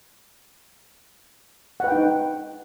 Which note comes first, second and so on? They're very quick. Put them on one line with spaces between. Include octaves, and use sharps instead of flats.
F#5 B4 G5 D#4